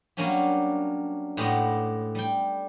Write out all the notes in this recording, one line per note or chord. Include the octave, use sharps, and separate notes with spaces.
F#3 G3 A#3 C#4 D4 G4
A2 G#3 B3 G4
G3 G5